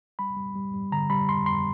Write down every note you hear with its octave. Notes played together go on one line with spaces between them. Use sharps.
G3 B5
G3
G3
G3
D3 A#5
G3 B5
F2 C6
F2 C6